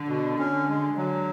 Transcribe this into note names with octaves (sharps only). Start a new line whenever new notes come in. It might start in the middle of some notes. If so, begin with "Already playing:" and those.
Already playing: D3
B2
C#4
G#3
D3 F#3